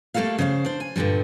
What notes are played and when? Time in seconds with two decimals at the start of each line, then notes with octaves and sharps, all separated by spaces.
0.14 G3 A3 A#3 F#4 A4 F5
0.38 C#3 C5 D5 F5
0.65 D4 C5
0.80 G#5
0.96 G2 A#2 D3 F3 G3